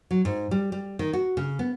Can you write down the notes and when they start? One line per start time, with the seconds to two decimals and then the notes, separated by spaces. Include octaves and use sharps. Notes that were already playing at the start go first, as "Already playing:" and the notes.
0.11 F#3
0.25 G#2
0.51 G3
0.72 G3
0.99 D#3
1.13 F#4
1.37 C#3
1.59 B3